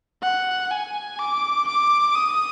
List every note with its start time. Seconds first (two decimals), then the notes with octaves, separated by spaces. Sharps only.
0.22 F#5
0.71 G#5
1.19 D6
1.67 D6
2.15 D#6